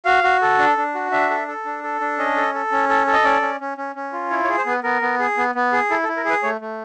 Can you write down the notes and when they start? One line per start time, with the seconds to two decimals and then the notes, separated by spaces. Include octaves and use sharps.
0.05 F#4 F5
0.24 F#4
0.42 A4
0.59 D4
0.77 D4
0.95 F#4
1.11 D4 E5
1.30 A4
1.48 A4
1.65 D4
1.84 A4
2.01 D4
2.18 C#4 D#5
2.36 A4
2.54 A4
2.72 C#4
2.89 A4
3.07 A4
3.13 D#5
3.24 C#4 D5
3.42 C#4
3.61 C#4
3.78 C#4
3.96 C#4
4.13 F4
4.30 E4 C#5
4.44 C#5
4.49 G#4
4.58 C5
4.66 B3 B4
4.83 B3 A#4
5.02 B3
5.20 G#4
5.37 B3
5.55 B3
5.73 G#4
5.90 E4 A4
6.04 A4
6.09 E4
6.17 A#4
6.25 G#4 B4
6.43 A3 C#5
6.61 A3